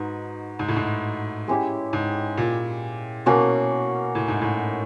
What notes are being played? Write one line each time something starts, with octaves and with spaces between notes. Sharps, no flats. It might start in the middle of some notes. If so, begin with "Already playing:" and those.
Already playing: G#2 D#4 F#4 B4
G#2
A2
G#2
G#3 C#4 E4 G4
G#2
A#2
B2 A#3 C#4 F#4
A2
G#2
A2